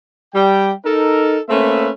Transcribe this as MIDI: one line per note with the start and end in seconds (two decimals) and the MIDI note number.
0.34 0.71 55
0.34 0.71 79
0.85 1.38 63
0.85 1.38 69
0.85 1.38 70
1.49 1.89 57
1.49 1.89 58
1.49 1.89 60
1.49 1.89 61
1.49 1.89 71
1.49 1.89 76